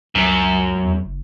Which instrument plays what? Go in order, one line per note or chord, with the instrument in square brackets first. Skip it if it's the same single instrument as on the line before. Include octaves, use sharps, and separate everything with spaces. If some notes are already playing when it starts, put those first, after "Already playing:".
[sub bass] C#2 [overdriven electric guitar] F#2
[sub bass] E2
F#1